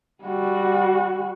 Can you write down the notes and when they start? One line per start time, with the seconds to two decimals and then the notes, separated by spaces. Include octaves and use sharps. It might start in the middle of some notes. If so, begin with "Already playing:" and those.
0.24 G3 F#4